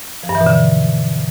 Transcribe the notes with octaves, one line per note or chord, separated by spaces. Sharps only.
F3
G2
E3
B2
D3